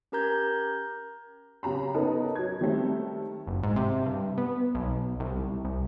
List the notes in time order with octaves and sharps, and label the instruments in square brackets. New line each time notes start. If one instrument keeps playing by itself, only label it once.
[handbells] C#4 G4 A#4 A#5 G6 G#6
[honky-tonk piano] C#3 G4 A#5 B5
B3 C#4 D#4 A4 A#4 D#5
F#3 G#6
D#3 G3 A3 C4
[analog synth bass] F#1
G#2
C3
G2
B3
B1
C2
C2